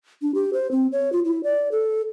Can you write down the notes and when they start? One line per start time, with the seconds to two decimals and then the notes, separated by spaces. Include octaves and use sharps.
0.22 D4
0.34 G4
0.53 C5
0.71 C4
0.92 C#5
1.12 F4
1.25 E4
1.44 D5
1.71 A4